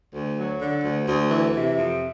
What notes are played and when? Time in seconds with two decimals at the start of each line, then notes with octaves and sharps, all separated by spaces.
0.14 D2
0.38 F#3
0.61 D3
0.84 D2
1.08 D2
1.31 E3
1.55 C3
1.78 F2